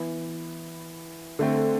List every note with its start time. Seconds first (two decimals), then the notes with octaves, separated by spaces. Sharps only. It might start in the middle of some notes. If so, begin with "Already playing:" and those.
Already playing: E3 B3
1.39 D3 A3 C4